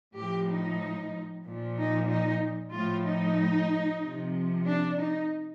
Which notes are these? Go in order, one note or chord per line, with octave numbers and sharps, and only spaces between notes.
A2 F3 G4
D#4
A#2 F3
D#4
D#4
A2 F3 F4
D#4
C3 F3
D4
D#4